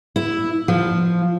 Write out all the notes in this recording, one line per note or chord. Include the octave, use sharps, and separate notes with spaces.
E4
F3